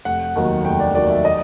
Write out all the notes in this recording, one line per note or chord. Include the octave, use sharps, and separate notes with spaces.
F1 F#5
D#2 D#3 F#3
F1 G5
D5
D#2 D#3 F#3 D5
E5
D#5